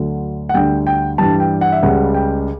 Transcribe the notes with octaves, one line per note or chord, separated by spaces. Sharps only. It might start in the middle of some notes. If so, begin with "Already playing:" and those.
Already playing: D2 D3 F#3
F#5
D2 D3 G3 G5
G5
G2 E3 G3 A5
G5
F#5
E5
C#2 C#3 G3 F#5
G5